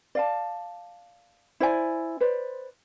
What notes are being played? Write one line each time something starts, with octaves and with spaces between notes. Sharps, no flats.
D5 F5 A5
E4 C5 D5 G#5
B4 C5 D5